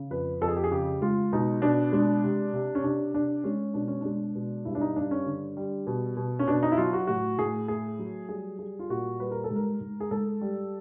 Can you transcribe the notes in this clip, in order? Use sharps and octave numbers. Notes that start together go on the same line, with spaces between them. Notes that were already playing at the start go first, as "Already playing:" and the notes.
Already playing: C#3
F2 B4
F2 A4
G#4
G4
G#4
C#3 G4
G#3 F4
B2 D#4
B2 D4
G#3 D4
C3
C3
C#4
C3 D4
C3 D4
G#3 C#4
B2 D4
C#4
G#3 D4
B2
G2 E4
D4
D#4
G2 D4
C#4
D3
G3
B2
B2
C#4
B2 D4
D#4
E4
F#3 F4
F#4
A2 F#4
A2 G#4
A3 G#4
F#3
G3 G#4
G3 G#4
F4
A#2 F#4
G3 B4
A#4
A4
G#2
A#4
G#2
G#4
G#2 A4
G3